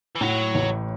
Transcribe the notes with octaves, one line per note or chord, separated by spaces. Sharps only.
E3
A2 F#3
A1